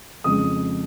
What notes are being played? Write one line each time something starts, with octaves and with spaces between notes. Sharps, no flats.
F2 C#3 G#3 D#6